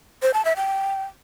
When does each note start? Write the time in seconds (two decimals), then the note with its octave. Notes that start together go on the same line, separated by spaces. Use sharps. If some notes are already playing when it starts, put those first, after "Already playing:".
0.22 C5
0.34 A5
0.45 E5
0.56 G5